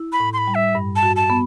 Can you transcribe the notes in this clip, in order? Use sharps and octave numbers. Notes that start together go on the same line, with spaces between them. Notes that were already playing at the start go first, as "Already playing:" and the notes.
Already playing: E4
B5
A2
C6
B5
G3
E5
G2
A5
F#4
A5
B3